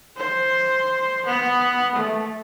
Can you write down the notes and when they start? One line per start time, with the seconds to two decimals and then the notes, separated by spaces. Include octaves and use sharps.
0.17 C5
1.26 B3
1.95 A3